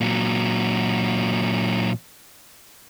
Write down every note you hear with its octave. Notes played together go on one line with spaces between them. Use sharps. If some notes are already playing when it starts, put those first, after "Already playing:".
A#2 F#3